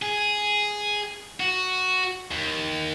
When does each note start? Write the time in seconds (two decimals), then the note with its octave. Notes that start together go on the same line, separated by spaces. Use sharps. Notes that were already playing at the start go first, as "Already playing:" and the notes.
0.02 G#4
1.40 F#4
2.31 D#2